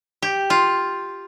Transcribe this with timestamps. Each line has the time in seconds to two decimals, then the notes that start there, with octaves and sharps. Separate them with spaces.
0.22 G4
0.50 F4